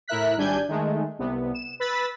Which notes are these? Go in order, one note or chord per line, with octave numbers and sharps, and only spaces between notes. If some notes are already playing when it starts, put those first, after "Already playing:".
A2 E4 A#4 E5 F#6 B6
G#1 G3 D4 G#5 G6 G#6
D#3 G#3 A3
C2 C3 B3
E7
B4 B5 E6 A6 B6